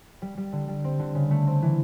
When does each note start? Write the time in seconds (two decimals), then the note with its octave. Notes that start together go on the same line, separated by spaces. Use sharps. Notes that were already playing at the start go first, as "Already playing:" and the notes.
0.22 G3
0.37 G3
0.53 D3
0.68 G3
0.84 C4
1.00 D3
1.15 C#3
1.31 A3
1.47 C4
1.62 E3